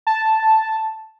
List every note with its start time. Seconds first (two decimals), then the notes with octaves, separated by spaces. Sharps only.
0.07 A5